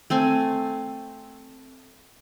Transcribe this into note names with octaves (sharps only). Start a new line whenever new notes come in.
A3 C4 G#5